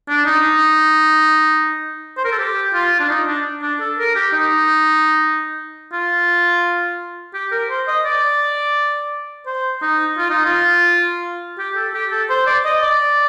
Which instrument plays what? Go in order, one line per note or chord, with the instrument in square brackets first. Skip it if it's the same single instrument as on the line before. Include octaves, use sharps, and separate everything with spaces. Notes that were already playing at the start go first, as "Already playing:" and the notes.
[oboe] D4
D#4
C5
A#4
A4
G4
F4
D4
D#4
D4
D4
A4
A#4
G4
D#4
F4
G4
A#4
C5
D#5
D5
C5
D#4
F4
D#4
F4
G4
A4
G4
A4
C5
D5
D#5
D5